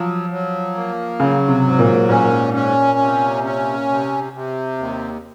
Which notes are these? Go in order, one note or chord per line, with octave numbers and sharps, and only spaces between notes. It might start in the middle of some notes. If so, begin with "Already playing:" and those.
Already playing: F3 F#3
F#3
A#3
C#3 F#3
C3
G#2
A#2
A#2 C#4
C#4
C3
C#4
C3
C3
D#2